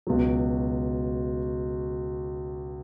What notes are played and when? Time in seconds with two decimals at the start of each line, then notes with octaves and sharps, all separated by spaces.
0.07 C#2 B2 F#3